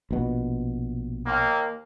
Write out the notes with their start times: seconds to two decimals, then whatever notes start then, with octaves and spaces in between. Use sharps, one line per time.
0.11 A#1 B2
1.26 D#2 A#3